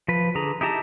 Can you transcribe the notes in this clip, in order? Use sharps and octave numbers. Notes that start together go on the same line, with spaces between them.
F3 B4
D3 G#4 A#5
D#4 E4 G4 A5 A#5